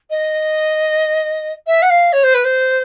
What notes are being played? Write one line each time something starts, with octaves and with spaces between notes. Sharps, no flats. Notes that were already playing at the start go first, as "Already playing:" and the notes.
D#5
E5
F#5
F5
C#5
C5
B4
C5